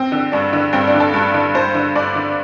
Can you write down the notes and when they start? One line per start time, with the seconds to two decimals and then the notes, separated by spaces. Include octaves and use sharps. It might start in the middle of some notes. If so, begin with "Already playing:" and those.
Already playing: C4
0.12 D3
0.32 G2 D4
0.53 D3
0.73 G2 C4
0.87 D4
0.94 D3
1.00 A4
1.14 G2
1.34 D3
1.55 G2 C5
1.75 D3
1.95 G2 D5
2.15 D3